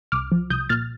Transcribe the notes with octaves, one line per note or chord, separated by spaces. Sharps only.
C2 D6 F6
F3
C2 D#6 G6
A#2 F6 A6